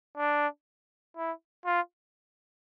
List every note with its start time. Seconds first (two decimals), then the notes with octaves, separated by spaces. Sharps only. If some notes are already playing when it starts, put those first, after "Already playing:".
0.18 D4
1.17 E4
1.66 F4